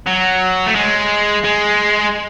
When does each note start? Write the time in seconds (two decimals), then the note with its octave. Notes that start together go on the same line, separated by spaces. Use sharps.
0.06 F#3
0.66 A3
0.75 G#3
1.45 G#3